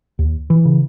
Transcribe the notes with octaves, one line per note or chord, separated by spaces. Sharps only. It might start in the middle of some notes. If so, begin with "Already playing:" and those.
D#2
E3
C#3